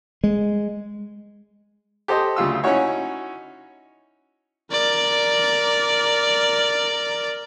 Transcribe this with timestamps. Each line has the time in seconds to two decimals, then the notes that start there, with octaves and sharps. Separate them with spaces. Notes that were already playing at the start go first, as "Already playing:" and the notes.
0.24 G#3
2.08 G4 A4 C5 D#5
2.36 D2 C#3 F4 E6
2.64 C#4 D#4 E4 F#4 C#5
4.72 A#4 D5